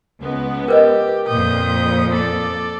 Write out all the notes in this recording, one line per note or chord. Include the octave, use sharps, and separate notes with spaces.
C#2 B3
G4 A#4 B4 D#5
F2 A#2 D#6 G6
A4 D5